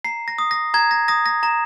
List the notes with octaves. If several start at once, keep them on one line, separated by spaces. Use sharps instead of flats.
A#5 C7
A#6
D#6
A#6
A#5 G#6
A#6
D#6 A#6
A#6
A#5 A#6